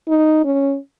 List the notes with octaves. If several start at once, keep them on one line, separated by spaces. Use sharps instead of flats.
D#4
C#4